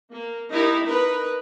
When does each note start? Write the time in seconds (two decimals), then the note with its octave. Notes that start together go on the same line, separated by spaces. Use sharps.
0.12 A#3
0.51 D#4 E4 G4 A#4
0.85 D#4 A#4 B4